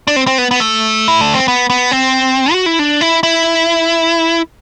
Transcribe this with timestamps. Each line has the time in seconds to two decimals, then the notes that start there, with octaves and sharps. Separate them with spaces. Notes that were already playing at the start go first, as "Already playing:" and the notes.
0.07 D4
0.16 C4
0.27 C4
0.38 B3
0.51 B3
0.60 A3
1.08 E4
1.21 D4
1.34 C4
1.48 B3
1.70 B3
1.91 C4
2.53 F#4
2.66 E4
2.79 D4
3.01 E4
3.23 E4